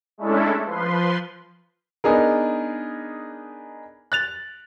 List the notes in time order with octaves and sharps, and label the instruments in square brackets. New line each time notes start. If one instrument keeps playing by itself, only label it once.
[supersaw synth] G#3 A3 C#4 D4 E4 A4
F3 B4 C6
[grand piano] B3 D4 D#4 G#4 A#4
F#6 A6 F7